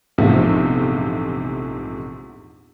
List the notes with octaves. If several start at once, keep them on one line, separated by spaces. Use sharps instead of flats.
A#1 E2 G#2 C3 F3 A3